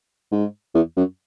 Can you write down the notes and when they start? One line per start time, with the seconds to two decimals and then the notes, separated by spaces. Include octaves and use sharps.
0.31 G#2
0.74 E2
0.96 F#2